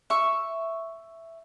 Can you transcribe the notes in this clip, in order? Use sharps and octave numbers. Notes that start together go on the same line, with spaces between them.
E5 C#6